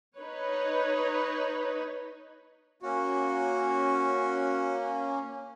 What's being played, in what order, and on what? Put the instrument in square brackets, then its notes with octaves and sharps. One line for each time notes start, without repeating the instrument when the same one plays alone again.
[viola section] D#4 B4 C#5
[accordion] A#3 C#4 [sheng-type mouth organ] F#4